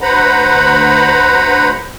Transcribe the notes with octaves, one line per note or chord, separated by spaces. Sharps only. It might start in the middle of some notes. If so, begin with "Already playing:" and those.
D2 B4 C5 F#5 A#5 B5